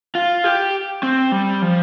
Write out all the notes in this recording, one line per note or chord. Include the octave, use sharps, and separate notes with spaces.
F4
G4
C4
G3
F3